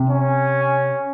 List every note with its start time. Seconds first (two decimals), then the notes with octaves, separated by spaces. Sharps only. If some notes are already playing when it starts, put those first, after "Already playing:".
Already playing: C3
0.09 C#4